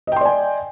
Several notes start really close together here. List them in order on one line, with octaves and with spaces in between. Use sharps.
D#5 G5 C6 D5 G#5